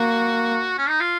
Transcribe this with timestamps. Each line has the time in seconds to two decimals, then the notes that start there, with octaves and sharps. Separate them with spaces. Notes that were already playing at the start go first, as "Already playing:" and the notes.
Already playing: A#3 F#4
0.78 C#4
0.89 D#4
1.00 F4